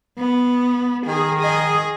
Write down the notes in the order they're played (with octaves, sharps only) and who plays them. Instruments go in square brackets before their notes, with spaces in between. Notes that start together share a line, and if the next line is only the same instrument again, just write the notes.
[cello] B3
[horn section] D#3 [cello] G#4
[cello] G#4 D#5